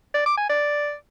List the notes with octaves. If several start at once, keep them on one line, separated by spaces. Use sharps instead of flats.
D5
D6
G#5
D5